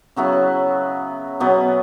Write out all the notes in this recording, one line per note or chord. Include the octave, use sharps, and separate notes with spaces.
C#3 F#3 B3 E4
B2 F#3 B3